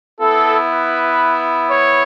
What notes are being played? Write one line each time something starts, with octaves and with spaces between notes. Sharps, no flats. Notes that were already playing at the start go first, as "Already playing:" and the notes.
B3 E4 A4
B4
C#5